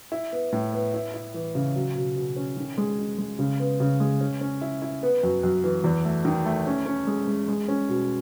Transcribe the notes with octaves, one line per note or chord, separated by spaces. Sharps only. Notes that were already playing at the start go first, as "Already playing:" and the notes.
E4
B3
A2
B3
E4
E4
E3
C#3
F#3
B2
B2
C#4
D#3
G#3
D#4
G#3
C#3
B3
C#3
G#3
C#4
C#4
E4
E4
B3
F#2
F#2
E3
E2
A3
D#3
A3
C#4
C#4
G#3
G#3
G#3
C#4
B2